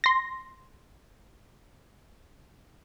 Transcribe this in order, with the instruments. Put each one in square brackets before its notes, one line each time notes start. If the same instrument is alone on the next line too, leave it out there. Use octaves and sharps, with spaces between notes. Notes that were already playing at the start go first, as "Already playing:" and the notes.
[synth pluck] C6 A#6